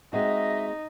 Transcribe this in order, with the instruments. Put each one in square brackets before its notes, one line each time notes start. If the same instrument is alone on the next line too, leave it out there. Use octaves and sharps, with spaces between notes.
[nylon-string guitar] G#3 C4 F#4 [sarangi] D#4 [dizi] D#5 [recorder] E5